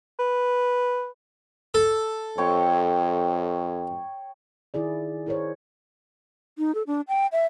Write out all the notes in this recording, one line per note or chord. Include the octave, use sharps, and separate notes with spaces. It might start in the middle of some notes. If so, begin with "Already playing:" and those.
B4
A4
F2 C#5 G5 C#6
D#3 E4 G#4 D5
E4 G#4 A#4 C5 C#5
D#4
A4
D4
G5
E5